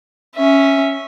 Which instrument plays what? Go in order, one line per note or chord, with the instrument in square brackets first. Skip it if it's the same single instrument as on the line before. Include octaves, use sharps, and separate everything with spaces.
[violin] C#4 E5